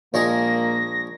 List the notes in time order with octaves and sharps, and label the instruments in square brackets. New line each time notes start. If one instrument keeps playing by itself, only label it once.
[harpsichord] A#1 G#3 G#4 [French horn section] A#2 A#3 [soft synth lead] A#6